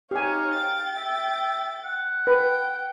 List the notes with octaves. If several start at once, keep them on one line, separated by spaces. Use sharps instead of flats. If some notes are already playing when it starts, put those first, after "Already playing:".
D#4 G4 C#5 F5 G#5
G5 A6
E5
F#5
B4 G5